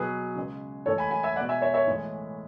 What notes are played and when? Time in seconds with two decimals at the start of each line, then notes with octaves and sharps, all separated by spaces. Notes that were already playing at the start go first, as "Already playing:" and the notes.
Already playing: B2 F#3 G#4 B4
0.35 C#3 G#3
0.86 A2 E3 G#3 A4 C#5
0.98 G#5 B5
1.11 G#5 B5
1.23 E5 G#5
1.36 G#3 D5 F#5
1.40 B2
1.49 E5 G#5
1.62 C#5 E5
1.74 C#5 E5
1.87 A2 E3 G#3